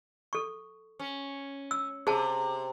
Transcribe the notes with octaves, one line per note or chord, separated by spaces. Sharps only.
A4 C#6
C#4
E6
C3 G#4 A#4 A5